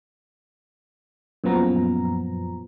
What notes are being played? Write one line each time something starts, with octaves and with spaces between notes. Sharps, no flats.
F#2 A#2 F3 B3 A#5